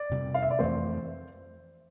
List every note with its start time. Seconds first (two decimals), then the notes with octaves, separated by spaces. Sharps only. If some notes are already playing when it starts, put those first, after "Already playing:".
Already playing: D5
0.10 F2 C3 G3
0.34 F5
0.42 E5
0.51 D5
0.59 F2 E3 A3 C4 C5